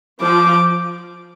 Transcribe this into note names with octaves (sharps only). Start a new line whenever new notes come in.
F3 D6